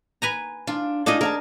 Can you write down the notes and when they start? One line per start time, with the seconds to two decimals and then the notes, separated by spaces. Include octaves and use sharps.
0.22 B4 G#5 A#5
0.67 D4 F4
1.06 G#3 D4 D#4 F4 G#4 D#5
1.21 G#4 A#4 E5 A5